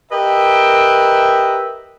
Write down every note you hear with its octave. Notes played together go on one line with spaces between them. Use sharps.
G4 A#4 B4 D#5 E5 G5